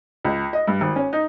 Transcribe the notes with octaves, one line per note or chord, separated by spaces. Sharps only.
C#2
D#5
G2
G#1
C#4
D#4